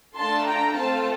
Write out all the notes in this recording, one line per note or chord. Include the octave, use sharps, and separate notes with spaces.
A3 D4 F4 A4 A5 C6
G5 A#5
A3 C4 F4 A4 F5 A5